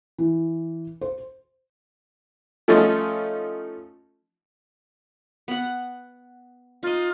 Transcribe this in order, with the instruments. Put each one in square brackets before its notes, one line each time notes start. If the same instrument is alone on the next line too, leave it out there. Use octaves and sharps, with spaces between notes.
[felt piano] E3
C5
[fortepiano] F3 A3 C#4 D#4 F4
[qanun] B3 F#5
[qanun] D#4 D#5 [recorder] F4